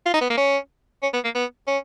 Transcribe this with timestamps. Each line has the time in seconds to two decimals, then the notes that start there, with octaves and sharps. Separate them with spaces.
0.06 F4
0.14 D#4
0.22 B3
0.30 A#3
0.38 C#4
1.03 C#4
1.14 B3
1.24 A#3
1.35 B3
1.68 C#4